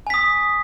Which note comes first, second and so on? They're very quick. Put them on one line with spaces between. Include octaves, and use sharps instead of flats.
G#5 B6 D#6